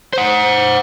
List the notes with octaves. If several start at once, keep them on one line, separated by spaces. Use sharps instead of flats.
C5 F#5